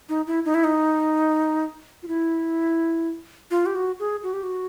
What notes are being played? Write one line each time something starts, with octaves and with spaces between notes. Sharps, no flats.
D#4
E4
D#4
E4
D#4
F4
E4
F4
G4
F#4
G#4
F#4
G4
F#4